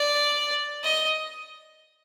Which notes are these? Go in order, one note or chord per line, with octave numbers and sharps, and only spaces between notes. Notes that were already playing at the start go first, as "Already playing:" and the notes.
Already playing: D5
D#5